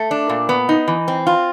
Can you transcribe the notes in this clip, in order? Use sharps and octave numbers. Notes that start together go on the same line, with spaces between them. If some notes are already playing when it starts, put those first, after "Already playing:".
Already playing: A3
D4
A#2
B3
D#4
E3
C4
F4